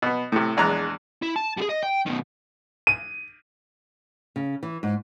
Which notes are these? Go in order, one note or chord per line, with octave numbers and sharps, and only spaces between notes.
B2 B3
A2 C3
A#1 E2 G#3 A#5 F#6
E4
A5
G3 G#4
D#5
G5
B2 D#3
D#7
C#3
E3
G#2